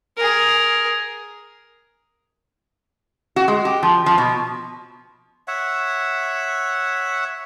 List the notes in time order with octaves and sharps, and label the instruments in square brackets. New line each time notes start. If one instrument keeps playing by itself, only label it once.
[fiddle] G#4 A#4
[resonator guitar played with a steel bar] F#4
G#3
G4
F3
F3
B2
[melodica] C#5 E5 F#5